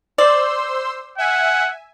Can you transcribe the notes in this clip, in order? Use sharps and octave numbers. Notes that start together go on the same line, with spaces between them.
C5 D5 C6 E6
E5 F#5 G#5